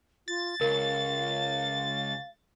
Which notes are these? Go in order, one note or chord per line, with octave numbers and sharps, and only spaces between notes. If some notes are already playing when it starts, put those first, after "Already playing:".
F4 A6
C#2 A#4 F5